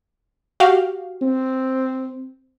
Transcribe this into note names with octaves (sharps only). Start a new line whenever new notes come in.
F#4 G4 F5
C4